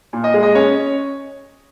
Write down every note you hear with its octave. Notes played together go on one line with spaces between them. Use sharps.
A#2
D#5
G#3
D#5
C#4 C#5